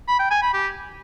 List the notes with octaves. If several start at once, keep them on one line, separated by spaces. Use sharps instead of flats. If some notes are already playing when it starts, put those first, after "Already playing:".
B5
G5
G#5
B5
G4